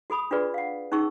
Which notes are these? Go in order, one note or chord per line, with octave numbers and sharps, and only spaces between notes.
F#4 A4 B5 D#6
D4 F4 F#4 G#4 B4 D5
F5 F#5
C#4 D#4 G#4 C#6 E6